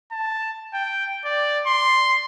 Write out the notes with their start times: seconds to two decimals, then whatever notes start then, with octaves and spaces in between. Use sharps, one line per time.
0.12 A5
0.74 G5
1.25 D5
1.67 C6